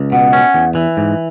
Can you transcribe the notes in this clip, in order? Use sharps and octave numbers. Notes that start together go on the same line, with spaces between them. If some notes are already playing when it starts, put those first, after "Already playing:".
Already playing: C#2
B2 F#5
C#4
E2
E3
G#2